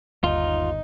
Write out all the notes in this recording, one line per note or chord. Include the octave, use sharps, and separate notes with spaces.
G1 D#2 D#4 F4